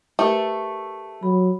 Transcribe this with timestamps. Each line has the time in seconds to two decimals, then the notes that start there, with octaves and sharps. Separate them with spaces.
0.19 A3 G4 A#4 B4
1.23 F#3 B5